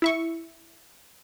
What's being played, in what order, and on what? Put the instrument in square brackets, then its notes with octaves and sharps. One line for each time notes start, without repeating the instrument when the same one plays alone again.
[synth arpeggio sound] E4 E5 C#6